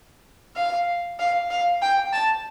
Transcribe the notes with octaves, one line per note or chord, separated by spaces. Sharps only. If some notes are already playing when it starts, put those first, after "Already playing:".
F5
F5
F5
G5
A5